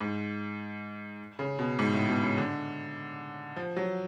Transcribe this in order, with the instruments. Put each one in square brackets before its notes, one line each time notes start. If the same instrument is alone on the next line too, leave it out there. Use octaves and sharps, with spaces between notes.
[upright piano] G#2
C#3
B2
G#2
A2
B2
C#3
D3
F3
F#3